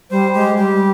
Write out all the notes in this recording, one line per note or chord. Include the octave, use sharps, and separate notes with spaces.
G3 C5
G#3 G4
G3 G4